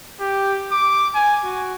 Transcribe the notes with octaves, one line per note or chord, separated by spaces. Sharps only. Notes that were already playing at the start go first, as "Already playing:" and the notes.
G4
D6
G#5
F#4